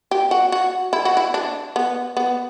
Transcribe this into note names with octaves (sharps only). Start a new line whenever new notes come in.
G4
F#4
F#4
E4
F#4
E4
D4
B3
B3